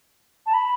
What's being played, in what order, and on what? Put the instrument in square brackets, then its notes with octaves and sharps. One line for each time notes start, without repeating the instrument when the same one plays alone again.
[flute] A5
B5